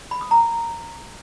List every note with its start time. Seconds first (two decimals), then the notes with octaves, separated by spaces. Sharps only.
0.11 B5
0.21 D#6
0.31 A#5